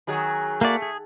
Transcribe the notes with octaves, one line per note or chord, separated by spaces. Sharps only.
D#3 F#3 G#4
A3 A#3 F#4 D5
G#4